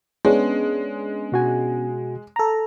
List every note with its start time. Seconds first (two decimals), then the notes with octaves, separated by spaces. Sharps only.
0.25 G#3 B3 C#4 D4
1.32 B2 F#4 G#5
2.36 A4 A#5